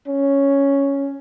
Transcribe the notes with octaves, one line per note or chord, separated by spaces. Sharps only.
C#4